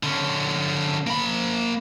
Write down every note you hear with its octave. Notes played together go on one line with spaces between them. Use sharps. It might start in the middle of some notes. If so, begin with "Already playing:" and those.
D3 C#4
A#3 B5